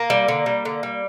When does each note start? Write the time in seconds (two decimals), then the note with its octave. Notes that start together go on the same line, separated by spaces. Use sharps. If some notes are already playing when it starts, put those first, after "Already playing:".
Already playing: A#3
0.10 G3
0.28 D3
0.46 G3
0.65 D3
0.83 G3